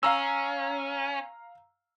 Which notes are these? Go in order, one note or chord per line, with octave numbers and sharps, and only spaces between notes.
C#4 F5 A#5 E6